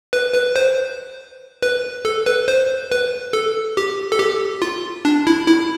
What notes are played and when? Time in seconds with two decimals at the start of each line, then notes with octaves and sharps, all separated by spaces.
0.13 B4
0.34 B4
0.56 C5
1.62 B4
2.05 A4
2.26 B4
2.48 C5
2.92 B4
3.33 A4
3.77 G4
4.12 A4
4.19 G4
4.62 F4
5.05 D4
5.27 E4
5.48 E4